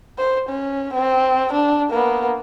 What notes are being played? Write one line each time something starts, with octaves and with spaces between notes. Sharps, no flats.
C5
C#4
C4
D4
A#3 B3